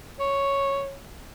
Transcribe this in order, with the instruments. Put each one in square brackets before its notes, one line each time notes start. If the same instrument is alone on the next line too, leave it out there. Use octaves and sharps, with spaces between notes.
[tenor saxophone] C#5